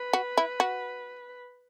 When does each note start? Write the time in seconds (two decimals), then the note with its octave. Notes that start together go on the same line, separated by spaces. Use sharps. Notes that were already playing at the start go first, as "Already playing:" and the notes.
Already playing: B4
0.13 F#4
0.37 E4
0.60 F#4